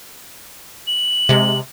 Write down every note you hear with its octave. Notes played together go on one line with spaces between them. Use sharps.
F#7
C3 G#3